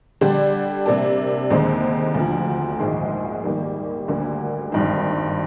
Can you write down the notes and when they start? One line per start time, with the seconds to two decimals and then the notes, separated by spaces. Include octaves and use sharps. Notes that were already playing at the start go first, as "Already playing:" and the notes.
0.21 D3 G3 D4 G4 D5
0.86 C3 G3 A#3 D4
1.50 D#2 D3 G#3 C4
2.15 D2 D3 F3
2.79 A#1 G#2 D#3 G#3
3.44 D#3 G3 A#3
4.08 D2 D3 G3 A#3
4.72 G#1 G2 D#3